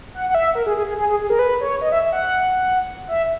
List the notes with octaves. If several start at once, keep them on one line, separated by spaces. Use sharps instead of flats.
F#5
F#5
E5
A#4
G#4
G#4
G#4
G#4
G#4
G#4
A#4
B4
C#5
D#5
E5
E5
F#5
E5